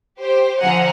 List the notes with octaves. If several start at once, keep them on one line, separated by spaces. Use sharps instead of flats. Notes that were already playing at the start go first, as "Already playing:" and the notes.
G4 C5
D3 F3 C5 F#5 G#5 A#5